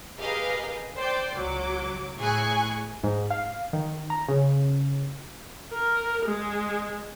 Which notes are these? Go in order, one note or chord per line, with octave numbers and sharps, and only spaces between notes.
G4 G#4 A#4 B4 D#5 F5
C5 D5 G5 C6 D6
C#2 F#3 D6
A2 E4 G#4 G#5 C#6 F#6
G#2
F5
D#3
A#5
C#3
A#4
G#3